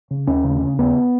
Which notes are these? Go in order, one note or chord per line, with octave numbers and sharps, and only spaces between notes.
C#3
D#2 C#4
C#3
C#3
D#2 B3